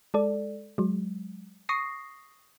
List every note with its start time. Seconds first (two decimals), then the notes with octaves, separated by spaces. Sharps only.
0.14 G#3 A4 D5
0.78 F#3 G#3
1.69 C#6 D#6 A#6 C7